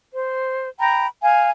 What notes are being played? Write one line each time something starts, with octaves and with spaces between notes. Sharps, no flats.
C5
G5 A#5 B5
F5 G#5